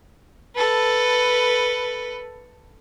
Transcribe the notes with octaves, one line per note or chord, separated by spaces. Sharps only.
A4 B4